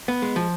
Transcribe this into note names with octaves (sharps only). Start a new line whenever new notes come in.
B3
G#3
F3